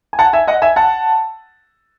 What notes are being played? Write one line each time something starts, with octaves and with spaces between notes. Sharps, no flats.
G#5
F#5 A5
E5 G#5
D#5 F#5
E5 G#5
F#5 A5